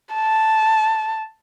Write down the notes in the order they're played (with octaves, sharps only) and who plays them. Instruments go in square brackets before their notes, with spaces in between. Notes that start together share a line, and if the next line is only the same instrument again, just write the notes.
[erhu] A5